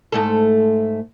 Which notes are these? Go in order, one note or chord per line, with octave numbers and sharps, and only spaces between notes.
G#2 A3 A4